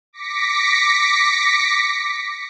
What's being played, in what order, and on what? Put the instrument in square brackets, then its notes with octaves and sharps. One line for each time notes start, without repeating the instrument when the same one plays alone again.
[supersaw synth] D6 A#6 B6 C#7